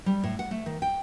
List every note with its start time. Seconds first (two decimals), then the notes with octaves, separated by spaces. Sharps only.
0.06 G3
0.23 A2
0.39 F#5
0.51 A3
0.66 D#3
0.82 G5